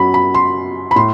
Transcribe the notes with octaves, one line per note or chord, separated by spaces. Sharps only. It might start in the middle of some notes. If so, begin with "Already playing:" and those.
Already playing: F#2 F#3 B5
B5
C6
B5
A2 C6